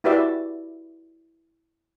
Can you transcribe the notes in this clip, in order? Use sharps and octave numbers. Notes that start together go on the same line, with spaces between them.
E4 F#4 G4 B4 D5 E5